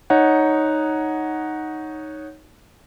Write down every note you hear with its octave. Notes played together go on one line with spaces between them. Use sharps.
D#4 C#5 F#5